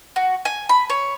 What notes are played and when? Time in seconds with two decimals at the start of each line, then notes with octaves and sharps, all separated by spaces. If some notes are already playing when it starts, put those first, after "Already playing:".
0.16 F#4
0.45 G#5
0.69 B5
0.90 C#5